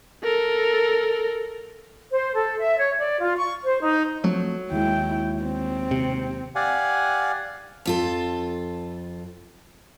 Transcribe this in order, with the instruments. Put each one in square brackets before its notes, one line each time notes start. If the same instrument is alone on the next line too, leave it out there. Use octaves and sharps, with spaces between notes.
[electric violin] A4 A#4
[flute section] C5
A4
E5
C#5
D5
F4
C#6
C5
D#4
[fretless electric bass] F3 A3 C4 [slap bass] F#3
[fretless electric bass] D#2 G#3 [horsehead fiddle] E4 G5
[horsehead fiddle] C4
[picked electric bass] C3
[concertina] G4 D5 F5 F#5 G#5
[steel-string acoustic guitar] F2 F4 A4